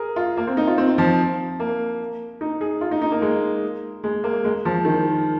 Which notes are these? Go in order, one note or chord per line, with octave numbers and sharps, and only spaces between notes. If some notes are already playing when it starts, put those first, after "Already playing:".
Already playing: G#4 A#4
F4
A#3
C4
D#4
F4
C4
F3
A#3
D#4
G#4
F4
D#4
D#4
A#3
G#3
G#3
A#3
G#3
F3
D#3